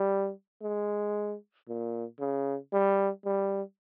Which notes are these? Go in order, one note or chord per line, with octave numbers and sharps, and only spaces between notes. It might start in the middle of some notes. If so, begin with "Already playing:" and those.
Already playing: G3
G#3
A#2
C#3
G3
G3